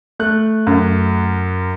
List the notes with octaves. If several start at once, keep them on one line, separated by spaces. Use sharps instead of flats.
A3 F#6
F#2